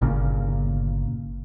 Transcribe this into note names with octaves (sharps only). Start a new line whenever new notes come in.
G1 A#2 C#3